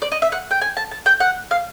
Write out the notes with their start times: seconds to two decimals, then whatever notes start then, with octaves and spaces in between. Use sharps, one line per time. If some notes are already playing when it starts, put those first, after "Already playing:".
0.02 D5
0.12 D#5
0.22 E5
0.32 F#5
0.51 G5
0.61 G#5
0.77 A5
0.91 A5
1.06 G5
1.20 F#5
1.51 F5